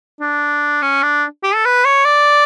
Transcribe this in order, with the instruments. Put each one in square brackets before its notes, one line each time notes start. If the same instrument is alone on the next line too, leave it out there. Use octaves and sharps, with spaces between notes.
[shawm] D4
C#4
D4
G4
A4
B4
C#5
D5